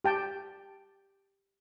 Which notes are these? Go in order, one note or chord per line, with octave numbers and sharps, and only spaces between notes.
G4 G5 A5